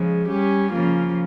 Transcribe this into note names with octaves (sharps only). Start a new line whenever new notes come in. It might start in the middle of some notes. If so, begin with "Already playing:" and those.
Already playing: C#3 F3 G#3
G3 C#4 G4
C#3 F3 A#3 F4